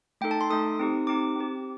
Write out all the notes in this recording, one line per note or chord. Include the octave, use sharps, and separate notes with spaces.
A3 D#4 A4 G5
A5
C6
A3 D#4 A4 D#6
C4 D#4 G4
C4 D#4 G4 D6
C4 G4